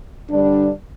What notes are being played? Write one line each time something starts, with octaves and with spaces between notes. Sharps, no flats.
G2 D3 G3 D4